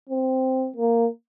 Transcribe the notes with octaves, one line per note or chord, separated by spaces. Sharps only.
C4
A#3